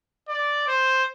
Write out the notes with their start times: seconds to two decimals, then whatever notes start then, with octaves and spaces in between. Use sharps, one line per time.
0.29 D5
0.68 C5